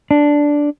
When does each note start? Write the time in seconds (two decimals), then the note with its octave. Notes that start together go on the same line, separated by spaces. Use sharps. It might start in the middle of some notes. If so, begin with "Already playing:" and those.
0.11 D4